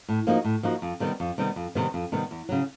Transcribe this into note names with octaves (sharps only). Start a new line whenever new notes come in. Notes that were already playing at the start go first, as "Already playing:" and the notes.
A2
F3 A#3 D#4 F#4
A2
F3 A#3 D#4 F#4
F2
C3 D#3 G3 B3
F2
C3 D#3 G3 B3
F2
C3 D#3 G3 B3
F2
C3 D#3 G3 B3
E2
C#3 F#3